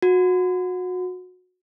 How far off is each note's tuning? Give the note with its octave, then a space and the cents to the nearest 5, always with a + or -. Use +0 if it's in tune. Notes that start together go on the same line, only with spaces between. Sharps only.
F#4 -25